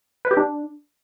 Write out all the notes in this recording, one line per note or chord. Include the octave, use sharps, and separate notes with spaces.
B4
G4
D4